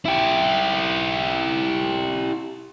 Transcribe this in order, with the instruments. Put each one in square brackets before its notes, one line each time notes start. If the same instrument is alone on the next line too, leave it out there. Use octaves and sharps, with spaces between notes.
[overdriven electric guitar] E4 G4